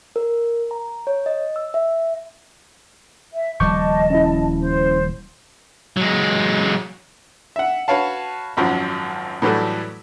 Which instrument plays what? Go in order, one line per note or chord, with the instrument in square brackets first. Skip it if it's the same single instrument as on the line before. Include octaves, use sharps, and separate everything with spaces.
[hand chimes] A#4
A#5
C#5
D#5
E6
E5
[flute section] E5
[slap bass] D#1 F3 G3 [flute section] D#5 A5 [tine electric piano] C#6 D6 G6
[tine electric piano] C#4 E4
[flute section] C5
[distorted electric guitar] F#3 G#3
[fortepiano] E5 F#5
F#4 B4 C#5 F5 A5
G#1 F#2 F3 F#3
A2 E3 F#3 G3 A3